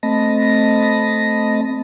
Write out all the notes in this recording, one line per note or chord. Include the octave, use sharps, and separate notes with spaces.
A3 C4 D#5 A5 B5 A#6